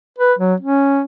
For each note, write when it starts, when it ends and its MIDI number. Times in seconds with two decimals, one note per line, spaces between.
0.18 0.33 71
0.39 0.54 54
0.60 1.02 61